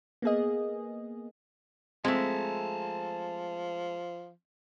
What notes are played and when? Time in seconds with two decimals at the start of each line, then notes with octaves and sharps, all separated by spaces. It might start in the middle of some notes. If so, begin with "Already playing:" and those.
0.22 A#3 B3 G#4 D#5
2.05 F3 G#3 A3 C4 G#5 A5